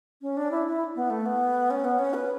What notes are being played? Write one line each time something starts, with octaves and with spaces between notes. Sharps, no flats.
C#4
D4
E4
E4
B3
A3
B3
C#4
B3
C#4
B4